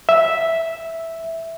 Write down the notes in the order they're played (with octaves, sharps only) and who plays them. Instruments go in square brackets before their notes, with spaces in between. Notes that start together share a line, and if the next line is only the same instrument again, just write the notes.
[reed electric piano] E5